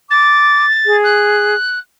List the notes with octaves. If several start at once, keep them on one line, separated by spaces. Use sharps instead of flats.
D6 A6
G#4
F#6